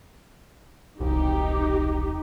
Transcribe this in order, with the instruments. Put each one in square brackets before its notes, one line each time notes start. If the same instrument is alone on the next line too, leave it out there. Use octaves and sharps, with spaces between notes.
[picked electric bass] E1 C2 [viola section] D#4 G4